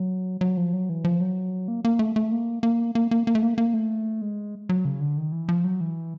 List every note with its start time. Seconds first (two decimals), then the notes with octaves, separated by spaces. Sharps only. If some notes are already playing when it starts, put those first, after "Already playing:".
Already playing: F#3
0.41 F#3
0.57 F3
0.73 F#3
0.89 E3
1.05 F3
1.21 F#3
1.68 A#3
1.85 A#3
1.99 A3
2.16 A3
2.32 A#3
2.63 A#3
2.95 A#3
3.11 A#3
3.27 A#3
3.35 A3
3.43 A#3
3.58 A#3
3.74 A3
4.22 G#3
4.69 F#3
4.85 C#3
5.00 D3
5.17 D#3
5.32 E3
5.49 F3
5.64 F#3
5.81 E3